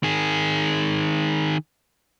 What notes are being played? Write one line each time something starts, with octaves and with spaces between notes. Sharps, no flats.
D#3 G#4